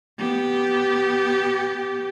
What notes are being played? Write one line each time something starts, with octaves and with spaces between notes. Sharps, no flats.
B3 G4